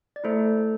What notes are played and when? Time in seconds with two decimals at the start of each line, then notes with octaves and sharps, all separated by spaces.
0.16 D5
0.24 A3 E4 A4 C5